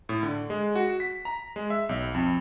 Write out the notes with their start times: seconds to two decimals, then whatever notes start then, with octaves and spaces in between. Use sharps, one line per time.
0.09 A2
0.23 D3
0.50 G#3
0.75 F#4
1.00 B6
1.25 A#5
1.56 G#3
1.70 E5
1.89 B1
2.14 F2